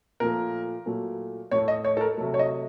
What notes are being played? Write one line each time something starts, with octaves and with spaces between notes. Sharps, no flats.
A#2 F3 A3 A#4
A#2 F#3 A3
A2 A3 C#5
D#5
C#5
A4
A#4
C3 F#3 A3
C#5
D#5